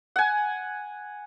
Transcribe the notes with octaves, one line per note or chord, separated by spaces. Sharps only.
F#5 G#5